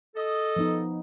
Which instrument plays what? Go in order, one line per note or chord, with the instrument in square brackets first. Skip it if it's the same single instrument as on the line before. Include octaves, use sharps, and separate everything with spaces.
[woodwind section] A4 D#5
[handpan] F3 B3 D#4